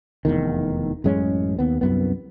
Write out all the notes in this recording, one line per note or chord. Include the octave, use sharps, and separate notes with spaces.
F1 A#1 E2 D#3
A1 F#2 G#3 C#4
D#2 B3
C2 F#2 B3